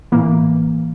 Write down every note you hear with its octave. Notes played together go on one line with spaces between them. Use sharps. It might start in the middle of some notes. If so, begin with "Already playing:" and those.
A2 E3 A#3